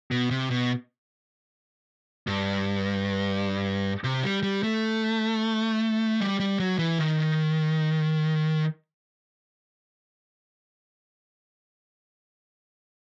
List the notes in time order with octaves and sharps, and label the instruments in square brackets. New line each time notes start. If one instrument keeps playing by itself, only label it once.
[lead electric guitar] B2
C3
B2
G2
C3
G3
G3
A3
G3
G3
F#3
E3
D#3